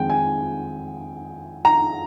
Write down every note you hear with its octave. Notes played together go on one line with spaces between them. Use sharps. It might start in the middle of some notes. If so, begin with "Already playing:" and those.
Already playing: F2 D#3 G#3 G5
G#5
A#5